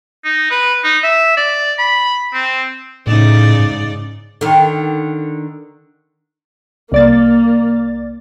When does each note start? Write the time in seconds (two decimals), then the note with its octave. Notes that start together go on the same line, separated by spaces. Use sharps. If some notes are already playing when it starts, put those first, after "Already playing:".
0.25 D#4
0.51 B4
0.84 D#4
1.04 E5
1.37 D5
1.78 B5
2.34 C4
3.07 A2 C#3 D#4 D5
3.59 G#2
4.41 D3 D#3
6.92 C2 A#3 D5 A6